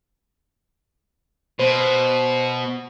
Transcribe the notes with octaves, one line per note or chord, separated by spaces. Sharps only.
B2 C5